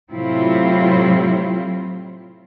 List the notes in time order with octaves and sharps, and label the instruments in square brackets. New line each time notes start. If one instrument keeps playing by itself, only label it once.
[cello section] A2 C3 F#3 C4 E4 F4